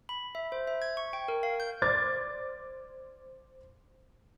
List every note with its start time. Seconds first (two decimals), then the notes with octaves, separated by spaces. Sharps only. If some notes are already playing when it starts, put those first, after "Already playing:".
0.09 B5
0.35 E5
0.52 C5
0.67 E5
0.82 G#6
0.97 C#6
1.13 G5
1.28 A#4
1.43 F5
1.60 G6
1.82 C5 D5 D6 F6 G#6 A6